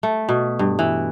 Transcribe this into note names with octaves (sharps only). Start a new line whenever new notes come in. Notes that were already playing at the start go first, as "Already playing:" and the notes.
A3
B2
G2
E3